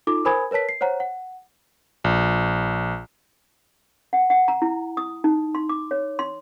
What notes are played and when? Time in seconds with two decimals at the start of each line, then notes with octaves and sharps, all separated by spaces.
0.07 D#4 F4 A4 D6
0.25 A#4 C5 G#5 B5 D#6 G#6
0.51 A#4 B4 C#5 A5 B6
0.69 C7
0.81 C5 C#5 F#5 A#5
1.00 F#5
2.04 A#1
4.13 F#5
4.30 F#5
4.48 A#5
4.62 E4
4.97 D#6
5.24 D#4
5.55 C6
5.69 D6
5.91 C#5
6.19 C6